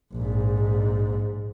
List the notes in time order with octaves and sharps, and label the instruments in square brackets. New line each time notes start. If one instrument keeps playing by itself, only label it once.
[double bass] A#1 G#2